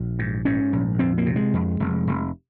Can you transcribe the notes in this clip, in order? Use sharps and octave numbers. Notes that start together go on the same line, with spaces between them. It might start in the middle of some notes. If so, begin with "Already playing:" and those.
Already playing: A#1
G#2
G#2 C#4
A#1
F2 C4
A#3
C3
G#3
F2
F1
F1